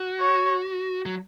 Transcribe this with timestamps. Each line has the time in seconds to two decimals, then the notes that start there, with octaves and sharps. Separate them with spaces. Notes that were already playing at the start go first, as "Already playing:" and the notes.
Already playing: F#4
0.21 C#5
1.06 F#3